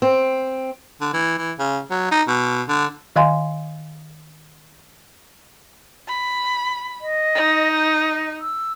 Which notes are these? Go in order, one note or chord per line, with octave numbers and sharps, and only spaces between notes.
C4
D3
E3
E3
C#3
F#3
D#4
B2
D3
D#3 D#5 F5 G#5 C6
B5
D#5
D#4
G6
D#5
E6